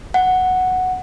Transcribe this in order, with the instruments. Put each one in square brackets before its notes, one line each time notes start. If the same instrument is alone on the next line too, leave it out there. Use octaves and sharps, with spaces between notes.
[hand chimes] F#5